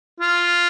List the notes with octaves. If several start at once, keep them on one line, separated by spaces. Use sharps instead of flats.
F4